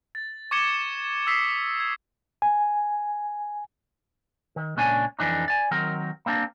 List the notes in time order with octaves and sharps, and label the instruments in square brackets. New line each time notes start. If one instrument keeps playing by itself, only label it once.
[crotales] A6
C#6 D6 G#6 C#7 E7 G7
D#6 E6 B6 C7 E7
G#6
[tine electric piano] G#5
[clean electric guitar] D#3
C#2 A#2 C#4 D4 G#5
F2 G#2 E3 D4 D#4
D5 G#5
D#3 F#3 C4 A#4
A#3 C4 D4